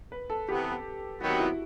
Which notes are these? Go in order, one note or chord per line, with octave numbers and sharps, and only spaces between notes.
B4
A4
C3 E3 B3 G4
C3 D#3 F#3 B3 F#4
E4